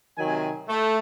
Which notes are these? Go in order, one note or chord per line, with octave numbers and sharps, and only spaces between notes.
C3 D#3 F#3 G#5
A3